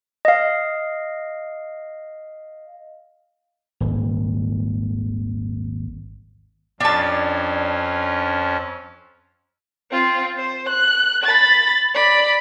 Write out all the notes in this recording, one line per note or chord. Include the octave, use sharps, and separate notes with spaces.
D#5 F5
D#1 G#1
F2 F3 C#4 D4 A5
C4 F4
C5
F#6
B5 A6
D5 B5